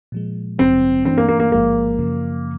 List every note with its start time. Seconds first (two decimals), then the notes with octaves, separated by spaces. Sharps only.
0.12 A#2 F3 G#3
0.59 A1 G2 D3 F#3 C4
1.05 G2 E3 A3 C4 D4
1.18 A#3
1.28 A#3
1.40 A#3
1.52 A1 G#2 F3 G#3 A#3
1.99 F#2 C#3 F3